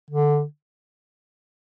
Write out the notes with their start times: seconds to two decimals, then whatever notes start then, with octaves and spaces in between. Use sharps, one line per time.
0.10 D3